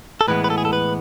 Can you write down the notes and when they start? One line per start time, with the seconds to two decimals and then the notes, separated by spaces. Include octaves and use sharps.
0.21 A4
0.28 A2 E3 G#3 B3 B4
0.44 B4
0.50 A4
0.58 G#4
0.65 A4
0.73 B4